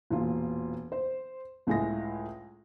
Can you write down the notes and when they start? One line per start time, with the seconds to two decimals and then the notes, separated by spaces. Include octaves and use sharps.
0.10 E1 A#2 F4
0.92 C5
1.67 C#2 A2 G#3 E5 A#6